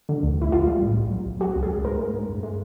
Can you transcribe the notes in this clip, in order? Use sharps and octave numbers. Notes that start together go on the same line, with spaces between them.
D3
D2
D2 E4
A#1 F4
G3
A2
B1
F#3
B1
F#3 F#4
C#2
G#4
C#2
G#2 A#4
G#3
G#2
G2
G#3